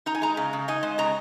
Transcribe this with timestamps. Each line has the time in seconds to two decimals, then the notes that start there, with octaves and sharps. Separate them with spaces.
0.06 D#4 A#5
0.15 G#5
0.22 G#3 A#5
0.37 C#3
0.53 C#3
0.68 D#4 G#5
0.83 G#3
0.98 C#3 A#5